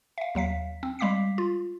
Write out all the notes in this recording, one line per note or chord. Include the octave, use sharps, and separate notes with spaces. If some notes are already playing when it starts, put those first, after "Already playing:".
E5 F5
D#2 F#3 F5 B6
C4
G3 G#3 F5 D6 B6 C7
F4